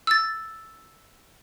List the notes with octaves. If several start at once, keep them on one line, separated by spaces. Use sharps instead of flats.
E6 A6